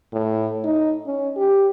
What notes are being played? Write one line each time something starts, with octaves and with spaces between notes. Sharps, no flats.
A2
D#4
C#4
G4